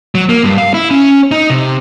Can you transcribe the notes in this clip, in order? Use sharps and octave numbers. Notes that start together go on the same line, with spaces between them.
F#3
A#3
G2
F5
E4
C#4
D#4
C3